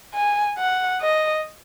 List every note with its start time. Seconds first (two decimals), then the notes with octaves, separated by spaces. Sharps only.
0.14 G#5
0.58 F#5
1.01 D#5